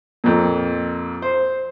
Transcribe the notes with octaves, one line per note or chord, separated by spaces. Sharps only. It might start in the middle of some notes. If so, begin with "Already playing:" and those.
F2 A#2
C5